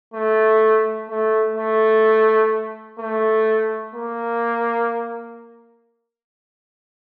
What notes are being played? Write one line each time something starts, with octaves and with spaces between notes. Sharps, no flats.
A3
A3
A3
A3
A#3